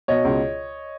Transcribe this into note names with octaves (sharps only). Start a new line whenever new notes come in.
B2 C#5 D#5
C#2